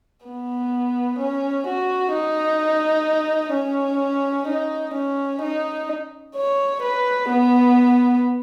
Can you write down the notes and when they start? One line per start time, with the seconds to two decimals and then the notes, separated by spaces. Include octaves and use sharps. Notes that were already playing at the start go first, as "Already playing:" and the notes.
0.25 B3
1.19 C#4
1.67 F#4
2.14 D#4
3.54 C#4
4.48 D#4
4.94 C#4
5.42 D#4
6.36 C#5
6.82 B4
7.29 B3